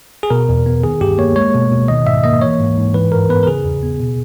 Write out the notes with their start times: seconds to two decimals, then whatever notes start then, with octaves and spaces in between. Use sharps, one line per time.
0.23 G#4
0.30 B2 A#4
0.49 E2
0.66 B3
0.83 D#3 G#4
1.01 G2 G4
1.18 A#3 C#5
1.36 G#3 C#5
1.54 B2
1.72 B2
1.88 D#3 D#5
2.06 G#2 E5
2.24 A#3 D#5
2.42 E3 C#5
2.59 G#2
2.77 G#2
2.94 E3 B4
3.11 G2 A#4
3.29 B3 B4
3.43 A#4
3.47 C#3 G#4
3.65 E2
3.83 B3
4.00 B2